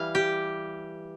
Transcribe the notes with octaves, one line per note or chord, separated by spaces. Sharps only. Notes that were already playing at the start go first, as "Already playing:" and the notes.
Already playing: E3 G3 F5
G4